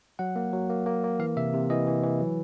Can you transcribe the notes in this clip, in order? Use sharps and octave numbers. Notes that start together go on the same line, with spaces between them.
F#3 F#5
A#3
F#3
A#3
A#3
A#3
E3 F5
C3 E5
C3
E3 D#5
E3
E3
F#3